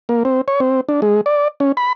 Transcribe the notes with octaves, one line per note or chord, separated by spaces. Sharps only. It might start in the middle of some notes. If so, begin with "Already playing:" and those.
A#3
C4
C#5
C4
D4
G#3
D5
C#4
B5